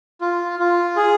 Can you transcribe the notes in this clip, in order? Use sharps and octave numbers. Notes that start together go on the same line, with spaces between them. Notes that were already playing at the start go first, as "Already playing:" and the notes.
F4
F4
G#4